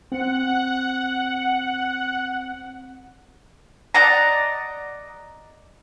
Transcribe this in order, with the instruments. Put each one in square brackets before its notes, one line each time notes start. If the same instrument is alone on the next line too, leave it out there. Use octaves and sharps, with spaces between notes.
[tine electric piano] C4 [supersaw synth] F#5
[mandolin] D5 D#5 F#5 A#5